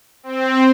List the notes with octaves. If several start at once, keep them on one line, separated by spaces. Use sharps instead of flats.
C4